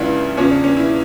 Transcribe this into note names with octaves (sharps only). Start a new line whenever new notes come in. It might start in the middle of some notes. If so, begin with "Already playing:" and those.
Already playing: C#2 C#3 F3 D4 E4
E2 C#3 F3 C#4
D4
C#4
E4